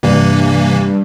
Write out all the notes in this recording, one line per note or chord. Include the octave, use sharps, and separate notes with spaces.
G2 C3 E3 A#3